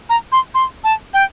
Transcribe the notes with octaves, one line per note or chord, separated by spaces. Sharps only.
A#5
C6
C6
A5
G5